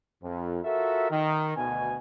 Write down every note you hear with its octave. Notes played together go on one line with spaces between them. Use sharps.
F2
F4 F#4 A4 A#4 E5
D#3
D2 B2 G#5